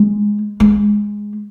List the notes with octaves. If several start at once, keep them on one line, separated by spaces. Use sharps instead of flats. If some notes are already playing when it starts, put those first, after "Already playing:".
Already playing: G#3
G#3